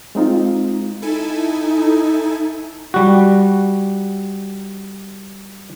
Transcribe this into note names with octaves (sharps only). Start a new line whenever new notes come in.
G#3 C4 D#4 F4
D#4 E4 A4 G#5
G3 F#4